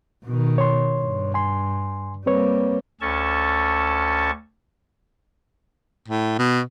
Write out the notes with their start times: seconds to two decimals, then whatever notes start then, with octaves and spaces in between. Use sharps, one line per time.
0.25 B2 D#3
0.58 C#5 C6
1.00 G2
1.34 G#5 C6
2.26 G3 A#3 C4 B4 C#5
3.01 D2 C#4 A4 A5 C#6
6.08 A2
6.39 B2